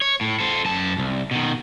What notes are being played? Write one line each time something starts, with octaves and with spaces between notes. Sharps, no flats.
C#5
A2
A4 C5
F#2 A5
C2
B2 D#3